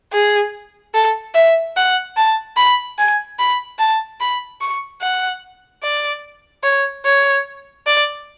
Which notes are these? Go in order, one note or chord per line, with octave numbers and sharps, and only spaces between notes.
G#4
A4
E5
F#5
A5
B5
G#5
B5
A5
B5
C#6
F#5
D5
C#5
C#5
D5